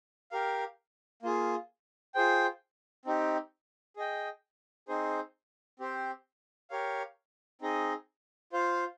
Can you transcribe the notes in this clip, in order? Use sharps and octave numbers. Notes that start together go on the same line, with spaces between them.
G4 A#4 F5
A#3 F4 G#4
F4 G#4 C5 G5
C4 D#4 G4
G#4 D#5 G5
C4 D#4 G#4 C5
C4 G4 C5
G4 A#4 C#5 F5
C4 D#4 G#4 D#5
F4 C5 F5